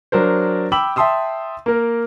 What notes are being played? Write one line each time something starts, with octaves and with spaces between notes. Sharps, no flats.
F#3 D4 A#4 C5
G5 B5 D6 E6 F#7
E5 G5 A5 C6 D#6 E6
A#3 A#4